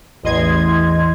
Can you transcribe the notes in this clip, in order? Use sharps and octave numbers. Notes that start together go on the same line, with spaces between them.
A1 E2 D#5 C6 G#6